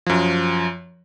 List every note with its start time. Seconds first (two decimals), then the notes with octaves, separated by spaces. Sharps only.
0.06 F#2 F3